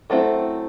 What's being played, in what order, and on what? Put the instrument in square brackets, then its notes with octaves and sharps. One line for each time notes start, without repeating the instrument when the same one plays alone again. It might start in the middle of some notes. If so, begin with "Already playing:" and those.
[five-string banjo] F#3 A3 C4 E4